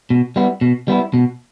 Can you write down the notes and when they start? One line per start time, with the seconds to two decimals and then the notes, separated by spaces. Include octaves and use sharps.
0.10 B2
0.36 G3 B3 E4
0.61 B2
0.88 G3 B3 E4
1.14 B2